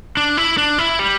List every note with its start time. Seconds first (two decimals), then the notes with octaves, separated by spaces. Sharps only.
0.17 D4
0.37 E4
0.58 D4
0.78 E4
0.99 G3